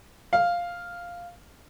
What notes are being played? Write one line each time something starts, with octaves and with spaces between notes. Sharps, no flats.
F5